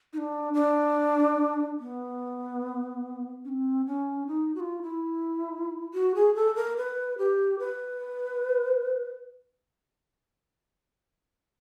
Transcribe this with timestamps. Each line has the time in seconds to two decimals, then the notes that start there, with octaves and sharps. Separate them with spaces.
0.13 D#4
0.18 D4
0.54 D4
1.79 B3
3.45 C#4
3.49 C4
3.87 C#4
4.27 D#4
4.55 F#4
4.60 F4
4.83 E4
5.94 F#4
6.15 G#4
6.35 A4
6.56 A#4
6.77 B4
7.18 G4
7.59 B4